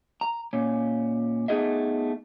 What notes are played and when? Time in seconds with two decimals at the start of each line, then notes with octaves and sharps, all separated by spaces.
0.21 A#5
0.53 A#2 C#4
1.48 A3 B3 D#4 G#4 D#5 E5